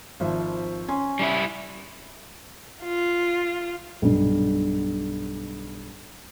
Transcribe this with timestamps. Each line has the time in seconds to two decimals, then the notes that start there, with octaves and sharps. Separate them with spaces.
0.20 G#1 F3 E5
0.88 C#4 G#5 C6
1.19 G3 D#4 E4
2.83 F4
4.02 B1 G2